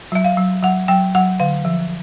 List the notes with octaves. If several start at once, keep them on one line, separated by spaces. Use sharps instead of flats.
F#3 E5
F5
F#3
F#3 F#5
F#3 G5
F#3 F#5
D3 F5
F3